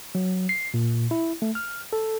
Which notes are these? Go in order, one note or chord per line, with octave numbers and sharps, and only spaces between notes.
F#3
C7
A#2
E4
A3
F6
A4